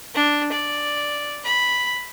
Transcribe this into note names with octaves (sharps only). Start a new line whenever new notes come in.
D4
D5
B5